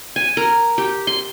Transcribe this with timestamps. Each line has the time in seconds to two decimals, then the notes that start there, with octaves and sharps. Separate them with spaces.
0.16 G#5
0.37 A#4
0.78 G4
1.07 C6